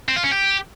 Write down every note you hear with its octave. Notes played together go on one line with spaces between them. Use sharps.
C4
F4
C#4
G4